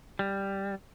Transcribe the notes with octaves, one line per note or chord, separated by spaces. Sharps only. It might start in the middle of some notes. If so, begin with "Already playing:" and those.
G3